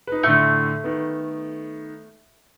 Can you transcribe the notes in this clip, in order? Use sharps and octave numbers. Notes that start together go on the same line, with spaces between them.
D#4 B4
A2 D3 A3
D#3 B3